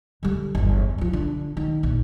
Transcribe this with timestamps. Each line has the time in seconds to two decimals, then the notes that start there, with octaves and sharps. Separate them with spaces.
0.23 D3 G3
0.55 G1 E2
0.98 E3 F3
1.13 D3
1.57 D#3
1.83 A#1